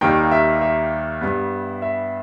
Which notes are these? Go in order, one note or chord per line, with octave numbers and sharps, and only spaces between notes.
D#2 D#3 G3 A#3 D#4 G5
E5
E5
G2 G3 B3
E5